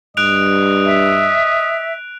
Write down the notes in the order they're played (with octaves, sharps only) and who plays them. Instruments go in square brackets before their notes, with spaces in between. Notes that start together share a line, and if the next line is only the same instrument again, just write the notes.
[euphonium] G2 [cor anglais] D#5 [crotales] F#6 D7 F7
[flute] E5